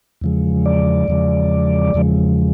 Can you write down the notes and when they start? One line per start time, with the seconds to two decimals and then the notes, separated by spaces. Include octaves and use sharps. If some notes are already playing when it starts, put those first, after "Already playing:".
0.21 E2 C#3 F3 G#3
0.66 D5
1.08 E2 C#3 F3 G#3
1.94 E2 C#3 F3 G#3